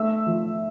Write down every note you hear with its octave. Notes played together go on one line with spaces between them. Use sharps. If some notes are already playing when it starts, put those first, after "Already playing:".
Already playing: A3 E5 E6
F3